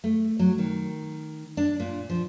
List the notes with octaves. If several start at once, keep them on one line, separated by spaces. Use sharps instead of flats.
A3
F#3
D#3
D4
A#2
F3